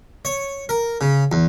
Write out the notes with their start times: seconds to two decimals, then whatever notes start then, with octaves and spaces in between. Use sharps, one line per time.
0.25 C#5
0.69 A#4
1.01 C#3
1.32 E2